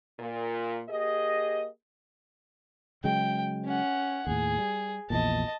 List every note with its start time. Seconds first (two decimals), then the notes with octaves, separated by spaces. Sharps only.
0.20 A#2
0.89 A#3 G4 G#4 D#5
3.04 C#3 F#3 G#3 G5
3.65 C#4 F#5
4.27 D#2 A2 G#4
4.58 G3
5.10 A#1 E2 A#2 D#5 A5